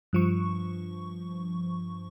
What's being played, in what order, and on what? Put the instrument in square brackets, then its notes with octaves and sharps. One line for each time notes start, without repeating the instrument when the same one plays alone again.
[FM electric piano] G2 F3 C#6